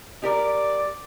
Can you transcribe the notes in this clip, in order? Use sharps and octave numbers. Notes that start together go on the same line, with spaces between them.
G4 A#4 D5